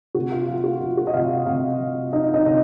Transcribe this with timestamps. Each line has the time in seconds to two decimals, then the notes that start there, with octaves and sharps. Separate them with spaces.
0.15 C3 F#4
0.32 F4
0.48 F3 F4
0.64 F#4
0.81 F3 F4
0.97 F#4
1.07 D#5
1.14 C3 F4 F5
1.46 C3 F4 F5
1.79 F3
2.12 F3 D#4 D#5
2.34 D#4 D#5
2.46 C3 D#5